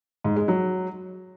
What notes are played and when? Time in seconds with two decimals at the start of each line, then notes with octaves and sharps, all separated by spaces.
0.24 G#2
0.36 G#3
0.48 F#3